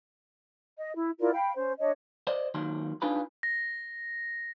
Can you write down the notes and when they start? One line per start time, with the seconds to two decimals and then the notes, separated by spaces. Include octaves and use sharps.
0.79 D#5
0.95 E4
1.19 E4 F4 A#4 D5
1.33 F5 G5 B5
1.56 C#4 C5
1.79 D4 C#5 D#5
2.27 C5 D5 D#5
2.54 D#2 D#3 F#3 C6
3.02 D4 D#4 F4 G#4 B4 B5
3.43 A#6